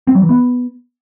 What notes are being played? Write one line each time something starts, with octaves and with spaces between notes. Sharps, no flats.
C4
F#3
E3
B3